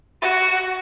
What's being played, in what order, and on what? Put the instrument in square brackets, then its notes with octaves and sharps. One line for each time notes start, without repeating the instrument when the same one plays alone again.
[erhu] F#4